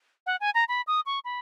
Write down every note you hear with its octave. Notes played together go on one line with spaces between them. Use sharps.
F#5
G#5
A#5
B5
D#6
C#6
B5